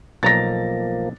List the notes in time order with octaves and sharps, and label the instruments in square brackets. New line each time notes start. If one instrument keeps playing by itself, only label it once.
[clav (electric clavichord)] B1 A#5 [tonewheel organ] F3 A#3 [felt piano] A6 A#6